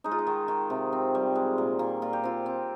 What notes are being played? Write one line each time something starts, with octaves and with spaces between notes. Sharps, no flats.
G#3 D#4
F4
D#4
D#3
D#3
C3
C4
G3
G#3
A#2
A#2
A#2 F4
G4
C4 F4
C4